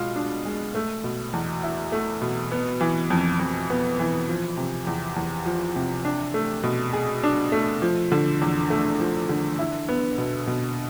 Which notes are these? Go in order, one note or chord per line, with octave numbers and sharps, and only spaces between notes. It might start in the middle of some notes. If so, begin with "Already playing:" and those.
Already playing: B2 G#3 F4
D4
G#3
A3
B2
E2
E4
A3
B2
B3
E3
F2
F2
B3
E3
F3
C3
E2
E2
F3
C3
D4
A3
B2
G#4
D4
A3
F3
D3
E2
A3
F3
D3
E4
B3
B2
B2